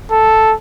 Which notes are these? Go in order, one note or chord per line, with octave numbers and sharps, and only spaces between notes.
A4